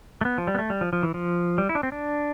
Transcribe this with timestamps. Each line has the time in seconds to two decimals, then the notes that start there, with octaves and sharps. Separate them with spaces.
0.21 A3
0.25 B3
0.38 F3
0.47 G3
0.55 B3
0.59 A3
0.70 G3
0.81 F3
0.93 F3
1.03 E3
1.14 F3
1.58 G3
1.69 E4
1.75 D4
1.83 C4
1.92 D4